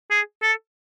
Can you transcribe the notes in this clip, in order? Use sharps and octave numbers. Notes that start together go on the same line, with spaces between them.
G#4
A4